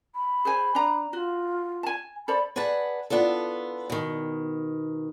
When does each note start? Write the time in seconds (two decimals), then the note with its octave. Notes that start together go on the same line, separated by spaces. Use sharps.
0.15 B5
0.45 G#4 C5 G#5
0.75 D4 A#5
1.13 F4 F#4
1.83 G#5 A5
2.28 A4 C5 D5 B5
2.56 G#4 B4 D5 F#5 A5
3.10 B3 D4 F4 A4
3.90 B2 D#3